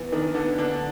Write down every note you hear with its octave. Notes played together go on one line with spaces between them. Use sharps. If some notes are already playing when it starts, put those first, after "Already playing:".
Already playing: E3 B3
D#3 D4
D3 B3
D3 D4